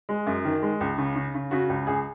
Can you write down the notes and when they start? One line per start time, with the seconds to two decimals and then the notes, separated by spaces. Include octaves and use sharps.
0.09 G#3
0.27 F#2
0.45 D#3
0.62 G#3
0.80 C#2
0.98 C#3
1.15 C#3
1.34 C#3
1.51 C#3 F#4
1.69 C#2
1.87 C#2 G#4